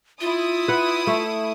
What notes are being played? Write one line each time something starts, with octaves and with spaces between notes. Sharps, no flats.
E4 F4 D#6
B4 F#5
A3